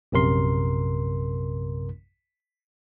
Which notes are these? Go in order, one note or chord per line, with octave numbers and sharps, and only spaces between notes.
A#1 F#2 C3 A#4 C6